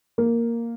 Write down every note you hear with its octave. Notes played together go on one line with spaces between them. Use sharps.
A#3